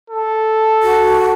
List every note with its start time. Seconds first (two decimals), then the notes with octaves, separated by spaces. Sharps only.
0.10 A4
0.83 F#4